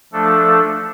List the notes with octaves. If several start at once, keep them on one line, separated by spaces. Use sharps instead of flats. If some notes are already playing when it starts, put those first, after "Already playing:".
F3 A3 D4 A4